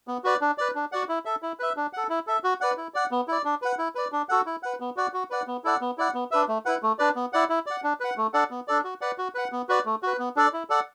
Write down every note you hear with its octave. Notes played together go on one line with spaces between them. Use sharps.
B3
F#4 B4 D5
D4
B4 D5
D4
F#4 D5 F#5
E4
A4 E5
E4
B4 E5
D4
A4 F#5
E4
A4 E5
F#4
B4 D5 F#5
E4
D5 F#5
B3
E4 D5
D4
B4 F#5
E4
B4 D5
D4
F#4 A4 F#5
E4
B4 F#5
B3
F#4 D5 F#5
F#4
B4 D5 F#5
B3
E4 A4 D5 F#5
B3
E4 D5 F#5
B3
D4 B4 E5
A3
E4 B4 F#5
A3
D4 B4 D5
B3
E4 D5 F#5
E4
D5 F#5
D4
B4 F#5
A3
D4 A4 D5 F#5
B3
D4 A4 D5
F#4
B4 D5 F#5
F#4
B4 F#5
B3
F#4 B4 D5
A3
F#4 B4
B3
D4 A4 D5
E4
A4 D5 F#5